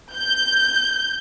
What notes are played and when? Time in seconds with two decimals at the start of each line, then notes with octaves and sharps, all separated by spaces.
0.15 G6